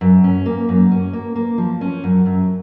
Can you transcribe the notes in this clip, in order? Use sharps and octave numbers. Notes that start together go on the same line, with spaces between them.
F#2
C#4
A#3
F#2
C#4
A#3
A#3
F3
C#4
F#2
F#2